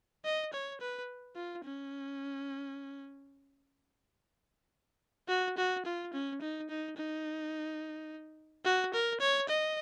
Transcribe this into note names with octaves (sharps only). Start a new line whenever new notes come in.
D#5
C#5
B4
F4
C#4
F#4
F#4
F4
C#4
D#4
D#4
D#4
F#4
A#4
C#5
D#5